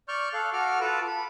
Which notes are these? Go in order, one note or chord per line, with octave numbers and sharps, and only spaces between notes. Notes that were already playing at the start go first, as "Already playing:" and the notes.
D5 C#6 F6 G6
A4 F5 F#6
F#4 A4 D6 F6
F4 A4 B4 A5 D6
B5